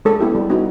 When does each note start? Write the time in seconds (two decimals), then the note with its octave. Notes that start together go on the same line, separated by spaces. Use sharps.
0.05 G#3 A4
0.20 B3 E4 G4
0.35 G3
0.50 B3 D#4 F#4